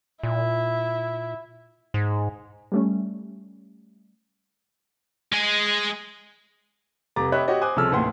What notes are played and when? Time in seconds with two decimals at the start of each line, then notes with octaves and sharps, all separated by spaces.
0.23 A#2 E4
1.94 G#2
2.72 G3 A3 C#4
5.33 G#3 G#4
7.16 F1 G3 A#5 D6 A6
7.32 G4 C#5 D#5 E5 B5 F#6
7.48 F#4 G4 C#5 D#5
7.61 C5 G#5 D6 D#6 F#6
7.76 C2 C#3 F3 A4 E6 F6
7.92 A1 D#2 F#5 C6